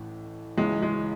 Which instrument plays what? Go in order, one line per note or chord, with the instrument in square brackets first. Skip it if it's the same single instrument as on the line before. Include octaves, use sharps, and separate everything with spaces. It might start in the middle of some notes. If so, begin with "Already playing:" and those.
Already playing: [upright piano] A1 A2 E3
C#2 C#3 E3 G#3
G#3